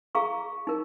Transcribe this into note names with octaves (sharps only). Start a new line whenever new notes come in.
G#4 F5 A#5 C#6
D#4 A#4